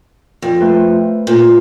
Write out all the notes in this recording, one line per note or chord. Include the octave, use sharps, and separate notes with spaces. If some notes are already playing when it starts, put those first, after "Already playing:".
F2
A3 B4 C5
A#2